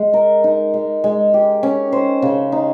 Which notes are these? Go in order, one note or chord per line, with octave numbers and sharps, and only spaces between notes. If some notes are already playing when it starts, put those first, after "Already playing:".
Already playing: G#3
A#4
D#4
G#3
G#3
G4
C#4
C5
C#3
D#4